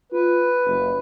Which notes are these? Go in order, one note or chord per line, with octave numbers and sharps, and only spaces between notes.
F4 B4
F#1